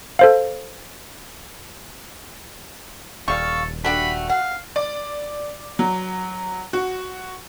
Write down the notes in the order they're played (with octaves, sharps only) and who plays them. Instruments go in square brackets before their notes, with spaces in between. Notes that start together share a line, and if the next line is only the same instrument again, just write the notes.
[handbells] A4 C5 F5
[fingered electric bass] D#1 [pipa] G3 [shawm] A4 [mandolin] F5 C#6
[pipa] A3 D4 G4 [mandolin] F#4 [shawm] B5
[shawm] F5 [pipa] F#5
[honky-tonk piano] D5
F#3
F#4